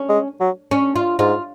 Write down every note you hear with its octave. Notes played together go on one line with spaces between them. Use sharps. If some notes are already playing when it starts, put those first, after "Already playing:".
Already playing: C#4
G#3
F#3
C#4
F4
G#2 F4